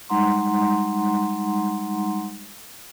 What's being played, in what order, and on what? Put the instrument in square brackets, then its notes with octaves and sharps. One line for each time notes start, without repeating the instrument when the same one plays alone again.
[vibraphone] G3 G#3 D#4 F#5 A#5 C6